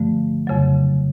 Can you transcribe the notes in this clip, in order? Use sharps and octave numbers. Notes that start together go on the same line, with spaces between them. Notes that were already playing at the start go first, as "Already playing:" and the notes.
Already playing: G2 D3 F3 A3
F2 C#3 F#3